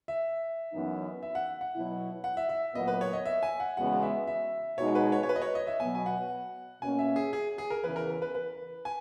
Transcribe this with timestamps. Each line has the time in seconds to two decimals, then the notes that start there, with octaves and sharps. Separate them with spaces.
0.08 E5
0.72 F#2 E3 B3 D#4
1.23 E5
1.35 F#5
1.61 F#5
1.74 B2 F#3 B3 E4
2.24 F#5
2.37 E5
2.49 E5
2.75 A#2 F#3 B3 D#5
2.88 B4
3.01 C#5
3.13 D#5
3.25 E5
3.43 G#5
3.60 F#5
3.77 E2 C#3 G#3 B3 F#4 F#5
4.02 E5
4.27 E5
4.78 B2 G#3 D#4 F#4 C#5
4.95 B4
5.12 C#5
5.23 C#5
5.29 B4
5.36 D#5
5.42 C#5
5.55 D#5
5.67 E5
5.80 B2 F#3 B3 G#5
5.95 G#5
6.06 F#5
6.82 B2 A#3 C#4 G#5
6.99 E5
7.16 G#4
7.33 G#4
7.58 G#4
7.70 A#4
7.84 E2 C#3 E3 B4
7.96 A#4
8.22 B4
8.35 B4
8.85 G#5